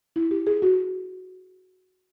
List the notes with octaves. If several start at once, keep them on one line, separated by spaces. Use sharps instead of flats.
E4
G4
G#4
F#4